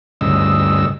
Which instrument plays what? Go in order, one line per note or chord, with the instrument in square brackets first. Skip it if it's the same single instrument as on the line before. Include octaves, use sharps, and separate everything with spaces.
[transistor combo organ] D2 G2 C#3 D#5 E6